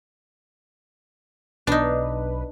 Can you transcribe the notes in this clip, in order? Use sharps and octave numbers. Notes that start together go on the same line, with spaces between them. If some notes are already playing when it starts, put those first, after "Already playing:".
B1 D4 D#4 B4